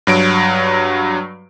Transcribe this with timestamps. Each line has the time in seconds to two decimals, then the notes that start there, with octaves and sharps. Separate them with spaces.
0.07 G2 F#3 D7